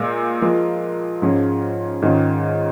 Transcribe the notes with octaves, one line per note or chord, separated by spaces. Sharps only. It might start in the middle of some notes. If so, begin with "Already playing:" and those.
Already playing: A#2 G#3 F4 A#4
F3 G#3 F4 A#4
G#2 F3 C#4 F4 G#4
G#2 D#3 G#3 C#4 F4